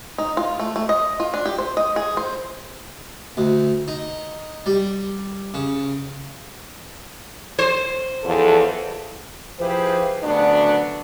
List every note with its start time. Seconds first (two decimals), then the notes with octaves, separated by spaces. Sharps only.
0.18 D#4
0.37 F4
0.59 A3
0.76 A3
0.89 D#5
1.20 F4
1.34 D4
1.46 G4
1.58 C5
1.77 D#5
1.96 G#4
2.17 C5
3.37 D2
3.88 D#4
4.66 G3
5.54 C#3
7.59 C5
8.24 E2 F3 A4
9.60 F3 E4 G4 G#4 B4 C5
10.23 D2 C#3 F#3 B3 D4